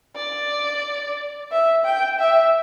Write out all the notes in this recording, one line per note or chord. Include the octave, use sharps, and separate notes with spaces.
D5
E5
G5
E5